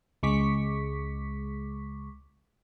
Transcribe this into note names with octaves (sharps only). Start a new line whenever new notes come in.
C#2 G#3 C#6 D6 B6